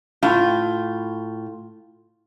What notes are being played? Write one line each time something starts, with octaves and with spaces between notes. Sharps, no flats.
A2 F4